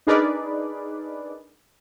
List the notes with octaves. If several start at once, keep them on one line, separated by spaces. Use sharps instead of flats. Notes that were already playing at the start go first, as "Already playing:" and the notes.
D4 D#4 G#4 A#4 B4 D5